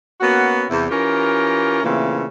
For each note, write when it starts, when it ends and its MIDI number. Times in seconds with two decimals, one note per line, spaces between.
0.21 0.64 58
0.21 0.64 59
0.21 0.64 61
0.21 0.64 66
0.69 0.85 40
0.69 0.85 48
0.69 0.85 64
0.89 1.81 52
0.89 1.81 61
0.89 1.81 65
0.89 1.81 67
0.89 1.81 70
1.83 2.25 46
1.83 2.25 49
1.83 2.25 52
1.83 2.25 57
1.83 2.25 58
1.83 2.25 60